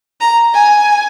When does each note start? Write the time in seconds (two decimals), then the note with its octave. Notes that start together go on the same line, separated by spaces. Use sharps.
0.21 A#5
0.54 G#5